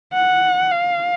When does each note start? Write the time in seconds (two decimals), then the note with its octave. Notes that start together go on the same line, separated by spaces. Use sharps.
0.13 F#5
0.71 F5